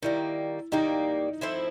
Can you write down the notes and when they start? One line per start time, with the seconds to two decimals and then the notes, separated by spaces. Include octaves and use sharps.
0.03 D#3 G3 A#3 E4
0.72 D#3 G3 A#3 D#4
1.41 F3 A3 C4 E4